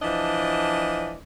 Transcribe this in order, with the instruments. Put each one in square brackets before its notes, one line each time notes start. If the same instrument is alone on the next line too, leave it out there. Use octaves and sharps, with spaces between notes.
[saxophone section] E3 F3 D4 D5 D#5